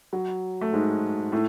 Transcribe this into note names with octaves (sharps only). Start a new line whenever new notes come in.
F#3
A3
G#2 G#3
A2 A3